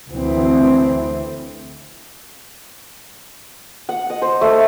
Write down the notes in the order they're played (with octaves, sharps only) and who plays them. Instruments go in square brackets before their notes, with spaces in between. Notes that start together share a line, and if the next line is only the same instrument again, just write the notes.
[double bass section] D2 E3 C4
[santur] F#5
D#5
C5
A3